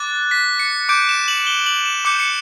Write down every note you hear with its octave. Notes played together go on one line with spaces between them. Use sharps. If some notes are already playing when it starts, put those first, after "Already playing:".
Already playing: D6 F#6 A6
B6
C#7
D6 G6 D7
E7
F#7
G7
F#7
E7
D6 G6 C#7
C#7